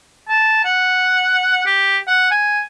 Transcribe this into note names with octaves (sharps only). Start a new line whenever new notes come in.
A5
F#5
G4
F#5
G#5